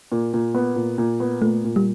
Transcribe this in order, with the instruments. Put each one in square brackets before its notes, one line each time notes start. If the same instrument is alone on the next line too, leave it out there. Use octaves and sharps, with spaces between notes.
[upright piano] A#2
A#2
B3
A#2
A#2
B3
[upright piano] A#2 [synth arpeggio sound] A3
[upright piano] A#2
[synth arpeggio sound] G3